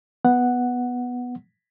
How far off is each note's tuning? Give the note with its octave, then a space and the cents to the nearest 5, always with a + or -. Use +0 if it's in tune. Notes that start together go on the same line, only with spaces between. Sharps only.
B3 +0 F#5 +0